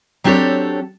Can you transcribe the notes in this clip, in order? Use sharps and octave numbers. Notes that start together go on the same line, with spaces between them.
F#3 C4 D4 G4 A4 C#5